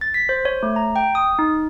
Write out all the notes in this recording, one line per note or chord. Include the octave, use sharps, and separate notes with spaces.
A6
B6
C5
C#5
A3
A#5
G5
D#6
D#4